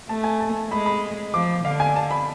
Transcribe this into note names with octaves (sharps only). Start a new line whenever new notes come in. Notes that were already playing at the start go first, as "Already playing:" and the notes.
A3 A5
G#5
A5
G#3 B5
B5
F3 D6
D3 F5
G#5
A5
B5